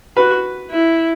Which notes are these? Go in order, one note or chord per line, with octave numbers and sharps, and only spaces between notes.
F#4 B4
E4